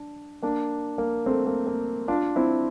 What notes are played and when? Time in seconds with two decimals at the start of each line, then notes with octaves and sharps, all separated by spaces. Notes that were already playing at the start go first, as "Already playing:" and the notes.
Already playing: D4
0.43 A#3 D4
0.98 A#3
1.26 A3 C4
1.47 A#3
1.67 A#3
2.08 D4 F4
2.36 C4 E4